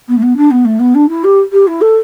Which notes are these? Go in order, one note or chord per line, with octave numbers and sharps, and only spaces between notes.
B3
A3
B3
D4
B3
A3
B3
D4
E4
G4
G4
E4
A4